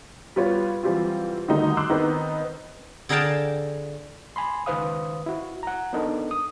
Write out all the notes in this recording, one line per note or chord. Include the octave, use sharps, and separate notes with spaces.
G3 B3 F4 B4 C#5
E3 F#3 G3 C4 F4
D3 D#3 G3 A3 D#4 F#4
C6 D6 E6 F#6
D#3 B3 C4 D#4
D3 G#4 A#4 F5 G5 A5
G#5 B5 C6
C#2 D#3 B4 C5 F5 D#6
E4 F#4
F#5 A#5
B3 D4 D#4 A4 A#4
D#6